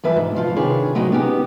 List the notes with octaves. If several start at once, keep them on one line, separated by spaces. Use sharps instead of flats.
G2 E3 F3 B4 E5
G#2
G#2 F3 F4
C3 D#3 D4 G#4 B4 C#5
F2 A2 F#3 G#3 A3
B3 C#4 D#4 G4